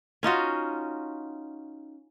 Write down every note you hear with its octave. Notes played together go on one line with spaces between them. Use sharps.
C#4 D#4 F4 F#4